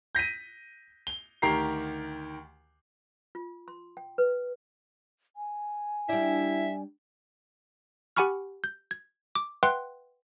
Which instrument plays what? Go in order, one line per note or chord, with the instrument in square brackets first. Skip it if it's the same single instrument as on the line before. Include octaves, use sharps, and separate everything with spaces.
[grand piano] G6 A#6 B6 D#7
G7
D2 D#3 G4 A#4 A#5 C7
[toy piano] F4
C6
G5
B4
[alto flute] G#5
[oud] G3 D4 [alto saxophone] E4 [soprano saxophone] E5
[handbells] G4 F#5 G#5 B5 C#6 F6
G6
G#6
D6
B4 E5 F#5 G5 C6 F#6